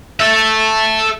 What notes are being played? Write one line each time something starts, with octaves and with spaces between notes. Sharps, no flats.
A4 E5